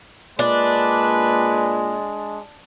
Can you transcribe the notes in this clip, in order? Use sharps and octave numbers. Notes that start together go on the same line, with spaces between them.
A#2 G#3 D4 B4